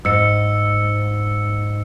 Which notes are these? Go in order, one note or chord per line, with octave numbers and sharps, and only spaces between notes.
G#2 E6 C#7